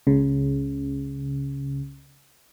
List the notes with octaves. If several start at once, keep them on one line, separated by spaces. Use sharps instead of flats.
C#2 C#3